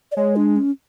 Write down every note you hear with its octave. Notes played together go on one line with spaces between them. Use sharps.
D5
G#3 C#5
D4
C#4